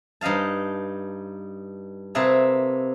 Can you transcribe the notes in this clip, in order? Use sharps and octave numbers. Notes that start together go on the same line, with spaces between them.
G2 D#4 D#5 F5 A5
C3 A#3 G#4 B4 E5 A5